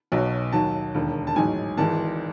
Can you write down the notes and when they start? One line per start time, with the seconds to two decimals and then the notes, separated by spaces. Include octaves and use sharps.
0.12 B1 B2 F#3
0.52 D#2 D#3 F#3 A5
0.94 E1 D#2 D3
1.27 A5
1.36 A1 G#2 D#3 F#3 G#5
1.77 G#1 G#2 E3 A5